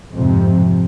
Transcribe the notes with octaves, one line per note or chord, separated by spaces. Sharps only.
F2 G#2 C3